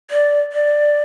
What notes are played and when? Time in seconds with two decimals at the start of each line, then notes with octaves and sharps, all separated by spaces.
0.11 D5
0.53 D5